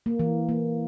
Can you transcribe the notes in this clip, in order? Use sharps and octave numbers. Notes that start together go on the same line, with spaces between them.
A#3
E3
A#3